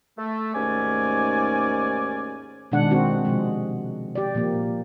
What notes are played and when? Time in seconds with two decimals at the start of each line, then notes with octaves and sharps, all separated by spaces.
0.18 A3
0.54 D#2 G#2 A3 C#4 D5 G#5
2.72 B2 D#3 G#3 D4 F#5
2.90 G#3 C4 F#4
3.25 C3 F3 G#3
4.15 G4 D5
4.34 A#2 F3 A#3